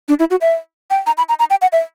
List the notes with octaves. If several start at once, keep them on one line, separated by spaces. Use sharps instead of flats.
D4
E4
F#4
E5
G5
A#5
B5
A#5
A#5
G5
F#5
E5